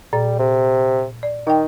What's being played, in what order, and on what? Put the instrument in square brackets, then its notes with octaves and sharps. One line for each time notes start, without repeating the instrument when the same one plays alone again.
[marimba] A#2 A6 [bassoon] G3
[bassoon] C3
[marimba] D5
[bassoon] D#3 [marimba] D#4 G5